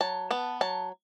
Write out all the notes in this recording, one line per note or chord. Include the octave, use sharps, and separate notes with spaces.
F#3 A5
B3 A5
F#3 A5